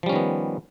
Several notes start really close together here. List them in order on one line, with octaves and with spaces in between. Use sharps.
F3 G3 C#4 D#3 B3